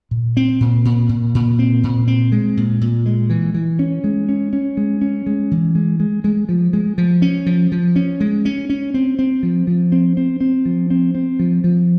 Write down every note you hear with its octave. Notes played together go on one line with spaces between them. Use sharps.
A#2
C4
A#2
A#2
A#2
A#2
C4
A#2
C4
G#3
A#2
A#2
G#3
E3
E3
C#4
G#3
C#4
C#4
G#3
C#4
G#3
E3
G#3
G#3
G#3
F3
G#3
F3
C#4
F3
F3
C#4
G#3
C#4
C#4
C4
C4
F3
F3
C4
C4
C4
F3
C4
C4
F3
F3